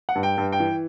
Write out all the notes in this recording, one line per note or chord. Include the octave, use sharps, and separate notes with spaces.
F#5
G2
G5
G2
G5
E3